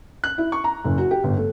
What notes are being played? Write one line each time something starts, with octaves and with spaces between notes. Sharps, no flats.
F#6
E4
C#6
A#5
F#1
F#4
G4
G1
A3